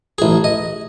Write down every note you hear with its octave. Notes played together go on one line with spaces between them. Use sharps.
A1 G#4
D#5